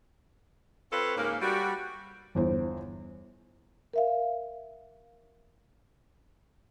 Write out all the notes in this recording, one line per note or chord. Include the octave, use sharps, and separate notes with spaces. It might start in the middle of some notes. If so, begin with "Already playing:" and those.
C4 F4 A4 B4 C#5
G#2 C#3 A#3
G3 F#4
G1 E2 C5
A#4 E5 F5